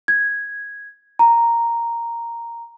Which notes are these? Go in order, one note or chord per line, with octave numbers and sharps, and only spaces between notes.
G#6
A#5